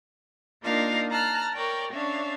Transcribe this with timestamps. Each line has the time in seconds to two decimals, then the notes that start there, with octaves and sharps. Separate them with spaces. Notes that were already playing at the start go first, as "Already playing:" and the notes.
0.62 A#3 D4 D#4 F4 A#4 F5
1.09 A5 A#5 F6 F#6
1.55 A#4 C#5 D5 G5
1.91 C#4 D4 C#5 E5 F5